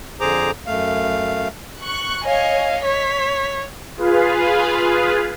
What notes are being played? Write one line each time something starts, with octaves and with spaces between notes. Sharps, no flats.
F2 D3 G#4 C5 A#5 D6
F#2 A3 F5
C#6 F#6
C#5 D#5 F5 G#5
C#5 B6
F4 G#4 B4 F5